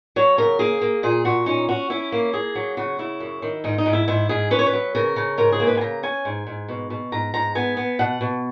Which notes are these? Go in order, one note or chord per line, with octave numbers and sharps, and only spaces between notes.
F#3 C#5
C#3 A#4
A#3 G#4
A#3
A#2 G#4
A#2 F#4
C#4 D#4
C#4 F#4
C#4 E4
A#3
A#3 G#4
F#3
C#3 F#4
C#3 E4
F#2
D#3
G#2 D#4
D#4
G#2
E4
G#2 E4
G#2 G#4
C#4 B4
C#5
B4
F#3
C#3 A#4
C#3
G#2 A#4
G#4
A#3
B4
G#5
C#3 A#5
C#4 G#5
G#2
G#2
B2
B2
G#2 A#5
G#2 A#5
B3 G#5
B3
B2 F#5
B2